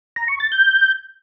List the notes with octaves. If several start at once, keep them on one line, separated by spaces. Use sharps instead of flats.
A#5
C#6
A6
G6